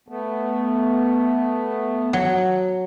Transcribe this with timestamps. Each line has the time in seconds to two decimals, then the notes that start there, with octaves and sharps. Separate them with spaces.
0.08 A3 B3
2.13 F#3